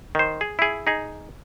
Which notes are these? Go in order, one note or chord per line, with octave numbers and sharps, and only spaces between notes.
D#3 C5
G#4
E4 G#4
D#4 G#4